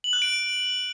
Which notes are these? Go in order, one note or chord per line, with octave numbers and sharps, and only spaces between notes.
F#7
F#6
D7